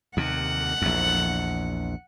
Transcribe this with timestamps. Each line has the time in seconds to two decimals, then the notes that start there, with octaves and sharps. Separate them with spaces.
0.17 D#2 C3 F#5
0.82 A#1 E2